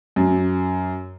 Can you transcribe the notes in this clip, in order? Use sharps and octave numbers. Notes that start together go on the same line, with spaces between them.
F#2